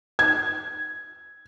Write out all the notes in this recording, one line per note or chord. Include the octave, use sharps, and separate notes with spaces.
G#6